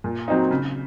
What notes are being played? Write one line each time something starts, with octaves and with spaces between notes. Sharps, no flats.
A#2
F#3 C4 D#4
C#3